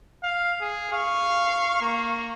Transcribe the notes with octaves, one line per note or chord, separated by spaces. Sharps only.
F5
G#4
F5 C#6
A#3